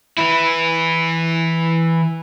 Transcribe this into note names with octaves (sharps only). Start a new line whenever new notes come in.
E3 E4